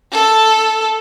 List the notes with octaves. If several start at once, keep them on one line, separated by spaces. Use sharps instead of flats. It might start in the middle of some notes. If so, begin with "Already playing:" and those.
A4